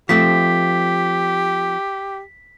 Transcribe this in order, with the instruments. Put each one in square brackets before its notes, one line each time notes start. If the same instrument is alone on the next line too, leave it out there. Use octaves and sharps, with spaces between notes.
[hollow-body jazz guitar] F3 A3 C4 [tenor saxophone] G4 [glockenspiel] B6